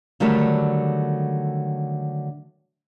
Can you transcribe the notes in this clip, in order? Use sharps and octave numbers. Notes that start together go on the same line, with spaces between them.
D3 D#3 F#3 G3 A3